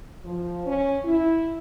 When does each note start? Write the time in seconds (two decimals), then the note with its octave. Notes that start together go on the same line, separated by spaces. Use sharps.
0.24 F3
0.66 C#4
1.05 E4